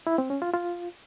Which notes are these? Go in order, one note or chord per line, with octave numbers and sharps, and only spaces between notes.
E4
C4
C#4
F4
F4